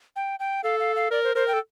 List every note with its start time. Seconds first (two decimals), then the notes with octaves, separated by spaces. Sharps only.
0.16 G5
0.40 G5
0.64 A4 F5
0.80 F5
0.96 F5
1.11 A#4 D5
1.24 C5
1.35 A#4 C5
1.48 G5
1.54 A4